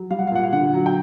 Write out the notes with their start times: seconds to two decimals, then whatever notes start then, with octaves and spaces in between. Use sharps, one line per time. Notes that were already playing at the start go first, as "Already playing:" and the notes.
Already playing: F#3
0.11 G3 F5
0.19 F#5
0.27 F5
0.32 A#2 F#5
0.44 F5
0.53 D3 F#5
0.74 F#3
0.86 G5